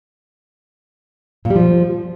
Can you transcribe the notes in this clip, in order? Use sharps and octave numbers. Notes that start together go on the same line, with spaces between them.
A#2
G3
F3